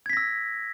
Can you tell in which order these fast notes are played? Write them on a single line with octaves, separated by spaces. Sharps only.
G#6 B6 A#6 E6